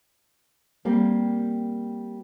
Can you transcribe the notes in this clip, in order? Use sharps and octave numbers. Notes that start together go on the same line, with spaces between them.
G3 A#3 C4